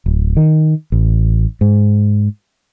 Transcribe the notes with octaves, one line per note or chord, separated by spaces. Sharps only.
D1
D#3
A1
G#2